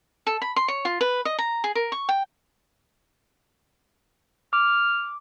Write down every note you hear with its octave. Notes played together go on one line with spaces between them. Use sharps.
A4
B5
C6
C#5
F4
B4
D#5
A#5
G#4
A#4
C#6
G5
D6 F6